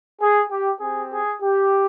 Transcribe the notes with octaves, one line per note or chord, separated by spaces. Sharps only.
G#4
G4
C4 G4 G#4
G#4
G4